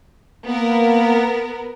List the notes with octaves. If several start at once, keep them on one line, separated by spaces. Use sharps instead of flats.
A#3 B3 A#4